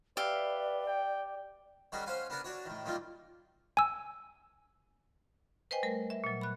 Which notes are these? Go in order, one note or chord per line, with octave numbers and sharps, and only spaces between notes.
G4 B4 D5 E5 F5
G5
D#3 G3 C#4 F#4 G#4
C#4 C5 F5 F#5 G#5
B3 D4 A#4 F#5 G#5
D4 F#4 C#5
A2 D#3
A#2 D#3 G3 A#3 F4
G#5 E6
B4 C5 D#5 G5 G#5
G3 A3 A#4
E5
A#2 F#3
B5 F#6